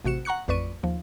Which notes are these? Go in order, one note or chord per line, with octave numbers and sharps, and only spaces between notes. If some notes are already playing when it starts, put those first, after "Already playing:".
A1 C3 F#4 C#7 E7
F#5 A#5 C#6 F#6 C#7
A1 F2 B4 D5 C#6 D#7
D#2 F3